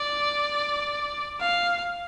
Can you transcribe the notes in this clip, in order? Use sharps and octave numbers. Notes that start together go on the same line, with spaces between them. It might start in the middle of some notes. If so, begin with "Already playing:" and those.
Already playing: D5
F5